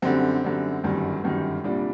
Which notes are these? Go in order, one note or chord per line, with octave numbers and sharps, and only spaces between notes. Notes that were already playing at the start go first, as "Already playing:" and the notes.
F#2 D3 G3 C4
F#2 D3 G3
G1 F#2 D#3 G3
G1 F#2 D#3 G3
C2 A#2 G3 D4